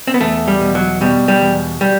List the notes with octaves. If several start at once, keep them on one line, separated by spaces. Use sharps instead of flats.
C4
B3
E2 A3
G3
B2
F#3
B2 G3
G3
E2
G3